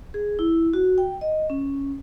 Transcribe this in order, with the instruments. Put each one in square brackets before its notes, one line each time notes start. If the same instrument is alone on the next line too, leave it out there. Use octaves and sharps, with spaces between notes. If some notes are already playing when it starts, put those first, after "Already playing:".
[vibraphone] G#4
E4
F#4
G5
D#5
C#4